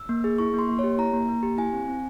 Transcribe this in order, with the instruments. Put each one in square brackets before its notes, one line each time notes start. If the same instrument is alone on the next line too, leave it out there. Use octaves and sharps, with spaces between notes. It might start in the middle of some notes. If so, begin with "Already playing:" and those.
Already playing: [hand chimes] E6
A#3
G#4
E4 C#6
A#3
C6
A#3
G4 C#5
E4 A#5
A#3
A#3
G4
E4 G#5
C4
C4